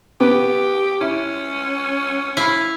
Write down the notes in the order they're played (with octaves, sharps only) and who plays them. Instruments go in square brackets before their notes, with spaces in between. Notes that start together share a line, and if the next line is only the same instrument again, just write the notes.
[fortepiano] B3 [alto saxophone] G4
[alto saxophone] C#4 [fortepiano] E4
[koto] E4 F5